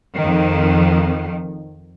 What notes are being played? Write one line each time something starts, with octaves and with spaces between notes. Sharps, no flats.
F2 D#3